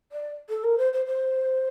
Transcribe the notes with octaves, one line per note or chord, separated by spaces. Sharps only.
D5
A4
A#4
C5
C5
C5